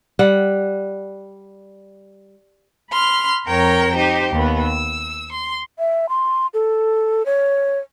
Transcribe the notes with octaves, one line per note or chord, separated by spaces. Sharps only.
G3 F#5
B5 C6 F6
F2 A#4 C#5 G5 A#5
D#4 G4 C5
D#2 B3
E6
C6
E5
C6
A4
C#5